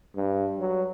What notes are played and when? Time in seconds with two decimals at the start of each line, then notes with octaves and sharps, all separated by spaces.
0.16 G2
0.59 F#3